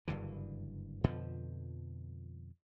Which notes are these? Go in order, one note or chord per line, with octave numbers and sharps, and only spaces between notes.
F#1 G2 D3 E3
F2 B2 D3 F3